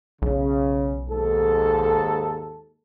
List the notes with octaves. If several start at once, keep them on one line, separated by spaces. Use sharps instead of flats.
B1 C#3
D#2 G#2 A4